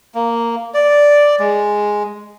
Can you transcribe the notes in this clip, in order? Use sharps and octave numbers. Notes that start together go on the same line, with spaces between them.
A#3
D5
G#3